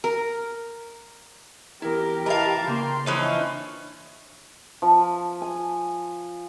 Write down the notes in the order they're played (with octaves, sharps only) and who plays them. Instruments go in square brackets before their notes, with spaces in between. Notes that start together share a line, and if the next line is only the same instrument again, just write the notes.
[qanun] A#4
[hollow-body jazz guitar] E2 E4 [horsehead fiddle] G4 [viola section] A#4
[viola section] E3 A5 [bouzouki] A#4 F5 [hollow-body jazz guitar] D#5 A#5
[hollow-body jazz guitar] C#3 A#3 [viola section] G5 C6
[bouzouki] E3 F3 D#4 [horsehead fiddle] D4 [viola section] C#5
[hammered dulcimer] F3
G#5